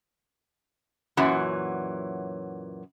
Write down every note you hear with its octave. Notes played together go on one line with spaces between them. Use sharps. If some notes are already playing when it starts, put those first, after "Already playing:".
F#2 A#2 E3 F#3